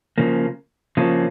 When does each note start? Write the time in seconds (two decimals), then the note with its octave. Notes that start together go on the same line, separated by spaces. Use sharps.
0.18 C#3 F3 A#3
0.97 C#3 F3 A#3